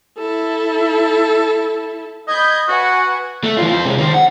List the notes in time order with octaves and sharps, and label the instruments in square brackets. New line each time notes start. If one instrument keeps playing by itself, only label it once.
[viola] E4 A4
[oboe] D#5 [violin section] B5 G6 G#6
[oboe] F#4 [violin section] B4 F#5 G#5
[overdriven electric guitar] A3
E3 F4
C4 F4
C3 G#3
D#3 C5
F#5